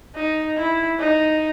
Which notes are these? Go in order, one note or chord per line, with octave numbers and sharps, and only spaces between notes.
D#4
E4
D#4